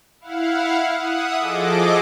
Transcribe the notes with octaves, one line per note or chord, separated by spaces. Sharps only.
E4 F5 F#5
E5 F#5 D#6
F3 G#4 A4 D#5 D6